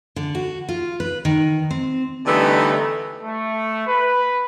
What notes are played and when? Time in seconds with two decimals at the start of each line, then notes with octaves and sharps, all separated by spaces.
0.16 D3
0.35 F#4
0.69 F4
1.00 B4
1.25 D#3
1.71 C4
2.26 D3 E3 G3 A3 B3 D#4
3.24 A3
3.88 B4